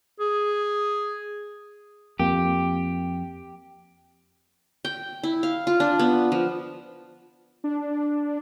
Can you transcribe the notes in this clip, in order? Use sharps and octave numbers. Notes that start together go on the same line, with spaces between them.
G#4
F2 A#3 G4
G5
E4
F5
F4
D4
B3
F3
D4